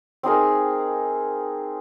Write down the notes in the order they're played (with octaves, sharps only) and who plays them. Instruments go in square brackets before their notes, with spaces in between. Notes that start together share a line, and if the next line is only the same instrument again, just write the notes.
[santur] C4 D#4 G#4 A#4